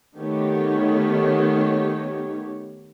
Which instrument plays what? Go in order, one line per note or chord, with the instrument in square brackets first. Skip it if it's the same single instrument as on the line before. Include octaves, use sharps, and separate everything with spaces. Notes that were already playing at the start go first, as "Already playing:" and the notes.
[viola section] D#3 A3 B3 G4 C#5